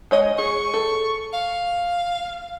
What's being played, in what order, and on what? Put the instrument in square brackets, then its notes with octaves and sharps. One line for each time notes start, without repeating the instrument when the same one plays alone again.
[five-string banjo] G#3 C#5 D#5
[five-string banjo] G#4 [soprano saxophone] C#6
[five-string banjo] A4
[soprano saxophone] F5